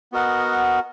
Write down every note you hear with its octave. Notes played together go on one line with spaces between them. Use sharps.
B3 F#4 A#4 D#5 F#5